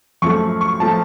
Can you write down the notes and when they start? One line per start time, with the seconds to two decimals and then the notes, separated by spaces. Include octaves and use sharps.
0.22 F#2 F3 A3 C#6
0.61 C#6
0.80 F3 A3 A5